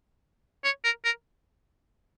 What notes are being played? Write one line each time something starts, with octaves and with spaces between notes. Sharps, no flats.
C#5
A#4
A#4